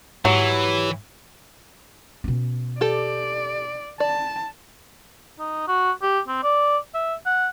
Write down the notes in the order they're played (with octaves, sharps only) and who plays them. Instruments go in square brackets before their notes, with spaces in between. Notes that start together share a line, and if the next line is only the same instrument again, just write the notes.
[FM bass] G#2 [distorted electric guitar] E3 [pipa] F#3 [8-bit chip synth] E4 G4 C#5
[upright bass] B2 C#4
[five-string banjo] G4 A4 [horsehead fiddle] D5
[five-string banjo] D5 [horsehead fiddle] A5
[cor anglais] D#4
F#4
G4
C4
D5
E5
F#5